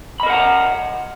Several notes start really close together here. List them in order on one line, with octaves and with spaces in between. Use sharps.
B5 D#5 A#4 F#5 A#5